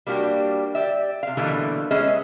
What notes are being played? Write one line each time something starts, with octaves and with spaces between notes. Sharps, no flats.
G3 A#3 D4 F#4 G4
G4 D5 E5
C3 F5
B2 D3 E3 G3 A3 A#3
G#3 B3 C#4 G#4 D#5 E5